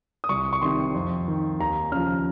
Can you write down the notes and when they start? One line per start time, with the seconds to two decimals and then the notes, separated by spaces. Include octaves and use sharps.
0.24 D#6
0.29 C2 C#6
0.53 C#6
0.62 C3 D#3 C6
0.94 F2
1.28 D#3
1.60 D#2 A#5
1.92 C#3 F3 F6